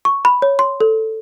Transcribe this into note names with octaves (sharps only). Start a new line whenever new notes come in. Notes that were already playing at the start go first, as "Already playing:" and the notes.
C#6
B5
C#5
C6
A4